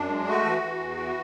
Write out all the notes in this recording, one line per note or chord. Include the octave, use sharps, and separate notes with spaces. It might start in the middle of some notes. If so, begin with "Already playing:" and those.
Already playing: F#2 D4
G#3
A3 F#4
E3
E3
E2
E3